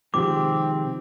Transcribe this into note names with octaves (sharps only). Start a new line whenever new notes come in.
C3 D#3 F3 G#3 C4 G4 D6